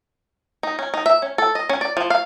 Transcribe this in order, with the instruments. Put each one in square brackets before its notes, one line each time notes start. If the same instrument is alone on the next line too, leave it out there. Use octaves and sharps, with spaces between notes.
[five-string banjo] D#4
C#4
D#4
E5
C#4
A4
D#5
C#4
D5
F3
F5